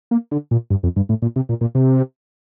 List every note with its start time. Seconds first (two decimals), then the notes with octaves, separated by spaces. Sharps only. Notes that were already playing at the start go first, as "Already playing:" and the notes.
0.11 A#3
0.31 D3
0.51 A#2
0.70 G2
0.83 F2
0.96 G2
1.09 A2
1.22 A#2
1.36 C3
1.49 A#2
1.61 A#2
1.75 C3